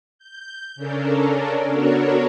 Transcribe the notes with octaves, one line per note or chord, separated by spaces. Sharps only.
G6
C#3 C#4 D4 A4 A#4
B3 D4 F#4 A4 A#4 C#5